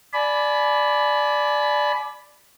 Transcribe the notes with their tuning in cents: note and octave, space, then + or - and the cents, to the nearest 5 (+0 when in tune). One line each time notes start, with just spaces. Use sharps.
D5 +0 G#5 +40 B5 +0